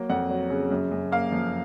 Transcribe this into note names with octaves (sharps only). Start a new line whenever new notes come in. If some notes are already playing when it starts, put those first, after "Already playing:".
Already playing: F#3 A#3
F2 F#5
F#3
C#3
F#2
F#2
A#3 F5
F3